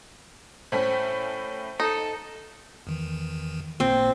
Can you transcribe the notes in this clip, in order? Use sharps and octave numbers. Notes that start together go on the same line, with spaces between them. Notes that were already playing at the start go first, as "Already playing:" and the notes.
A2 A3 C#4 C5
D#4 A4
E2 D#3 E3
A1 A#2 A#3 C4